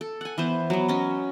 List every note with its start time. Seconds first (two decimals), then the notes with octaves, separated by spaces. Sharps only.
0.01 A4
0.21 F#5 G#5
0.38 E3 B3 C5
0.70 F#3 B3
0.88 C#4 D#5